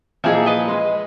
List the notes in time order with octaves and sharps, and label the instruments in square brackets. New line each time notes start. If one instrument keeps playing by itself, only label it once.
[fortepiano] A#2 E3 F3 [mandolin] D#4 G#4 E5
[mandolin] B4 D#5
[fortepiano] G#3 C6